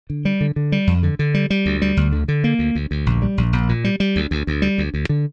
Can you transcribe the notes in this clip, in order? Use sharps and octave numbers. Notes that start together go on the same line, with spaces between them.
D3
G3
D3
D3
G3
F2
D3
D3
G3
G3
D2
G3
D2
D3
D3
A#3
D2
D2
D2
A#1
G3
A#1
A#1
A#2
G3
G3
D2
D2
D2
G3
D2
D2
D3